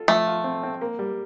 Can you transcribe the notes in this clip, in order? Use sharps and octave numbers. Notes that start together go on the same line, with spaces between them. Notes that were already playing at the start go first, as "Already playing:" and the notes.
Already playing: F4 A4
F3 A3
F4
C4
C4
A#3
G3